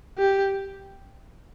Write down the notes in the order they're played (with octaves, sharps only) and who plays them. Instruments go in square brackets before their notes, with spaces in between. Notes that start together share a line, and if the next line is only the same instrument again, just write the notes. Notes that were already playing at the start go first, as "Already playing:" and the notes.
[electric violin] G4